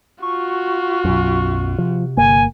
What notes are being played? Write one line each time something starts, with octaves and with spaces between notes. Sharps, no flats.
F4 F#4 C#6
B1 F#2
C3 F3
G1 A#3 G#5